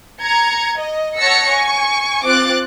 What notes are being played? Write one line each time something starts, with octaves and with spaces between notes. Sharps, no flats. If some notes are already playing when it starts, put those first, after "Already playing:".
A#5 G#6 C#7
D#5
C#5 F#5 A5 E6 A#6 C#7
G#5 C#6
C4 F4 D6 F#6 A6